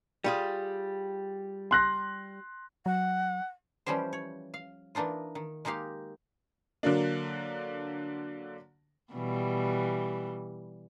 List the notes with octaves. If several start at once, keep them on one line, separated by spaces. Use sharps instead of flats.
G3 F4 G#4
C6 F#6 A#6
F#3 F#5
E3 F3 G3 C#4 G4 C5
C#5
F5
E3 A#3 D4 D#4 F4
D#3
G#3 A#3 D#4 G4 F5
D3 F#3 A#3 D4
B2 E3 G3